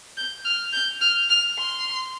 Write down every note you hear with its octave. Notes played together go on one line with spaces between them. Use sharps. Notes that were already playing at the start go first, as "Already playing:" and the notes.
G6
F6
G6
F6
F6
C6